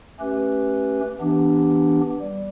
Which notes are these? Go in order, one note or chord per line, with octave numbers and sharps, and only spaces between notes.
A3 C#4 G4 B4
E3 B3 D4 G4
G3